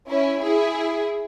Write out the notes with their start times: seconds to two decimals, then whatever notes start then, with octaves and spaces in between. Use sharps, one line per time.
0.09 C#4 E4
0.42 E4 G#4